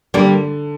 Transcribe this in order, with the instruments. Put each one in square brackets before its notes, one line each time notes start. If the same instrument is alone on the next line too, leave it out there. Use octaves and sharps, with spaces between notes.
[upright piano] D3 [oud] G3 A#3